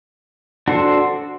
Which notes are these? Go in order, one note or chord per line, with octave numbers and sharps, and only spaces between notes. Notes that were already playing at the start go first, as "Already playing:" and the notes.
D4 F#4 A4 C5